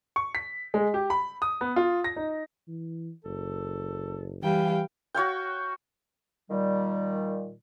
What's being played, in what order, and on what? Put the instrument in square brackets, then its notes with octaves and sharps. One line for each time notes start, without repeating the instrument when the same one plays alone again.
[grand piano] C#6
B6
G#3
G4
B5
D#6
B3
F4
A#6
D#4
[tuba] E3
[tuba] F#1 [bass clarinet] A4
[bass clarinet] E3 [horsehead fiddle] G3 [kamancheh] F5 G5
[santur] F#4 C#5 F5 G5
[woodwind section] A#2 D#3 G3